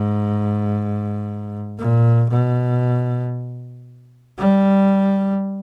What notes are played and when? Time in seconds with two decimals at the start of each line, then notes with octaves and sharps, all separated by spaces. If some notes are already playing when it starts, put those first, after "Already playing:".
Already playing: G#2
1.79 A#2
2.30 B2
4.39 G3